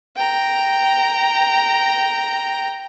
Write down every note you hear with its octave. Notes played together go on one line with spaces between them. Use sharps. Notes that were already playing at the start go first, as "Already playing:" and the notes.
G5 A#5